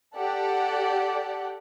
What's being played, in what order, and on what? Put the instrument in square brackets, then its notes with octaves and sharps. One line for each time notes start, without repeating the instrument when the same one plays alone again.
[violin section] G4 A4 D5 F#5